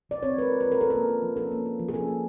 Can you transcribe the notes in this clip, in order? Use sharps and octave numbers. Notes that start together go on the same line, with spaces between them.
F3 D5
C4 C#5
G#3 A#4 B4
F4
F3 B4
A#4
C#4 A4
A#3 A#4
F4
F3
C#4 A4
A#3
F4
F3
G#4
C#4 A4
A#3